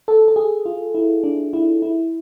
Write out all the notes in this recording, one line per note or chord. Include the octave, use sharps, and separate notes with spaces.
A4
A4
G#4
F4
E4
D4
E4
E4